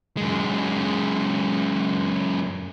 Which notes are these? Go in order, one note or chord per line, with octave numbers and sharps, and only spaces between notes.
F#2 G#3